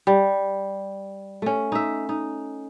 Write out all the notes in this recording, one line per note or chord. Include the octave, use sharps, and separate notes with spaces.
G3
A3 C#4
D#4 E5
D#4